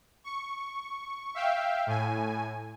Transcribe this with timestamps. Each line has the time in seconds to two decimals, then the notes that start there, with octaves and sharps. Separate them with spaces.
0.24 C#6
1.35 E5 F5 G5
1.87 A2 G#5